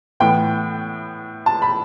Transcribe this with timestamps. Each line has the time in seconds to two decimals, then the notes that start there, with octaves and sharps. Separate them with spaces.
0.20 A2 E3 B3 G5
1.46 A5
1.62 B5